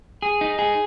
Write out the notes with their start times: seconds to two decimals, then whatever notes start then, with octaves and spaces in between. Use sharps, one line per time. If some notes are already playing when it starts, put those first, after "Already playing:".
0.22 G#4
0.41 D#4
0.59 G#4